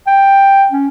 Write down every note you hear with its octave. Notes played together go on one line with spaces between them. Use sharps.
G5
C#4